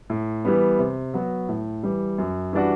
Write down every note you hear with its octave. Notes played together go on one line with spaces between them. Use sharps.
A2
E3 G3 B3
C3
F#3 B3 F#4
A2
E3 G3
F#2
E3 G3 D4 F#4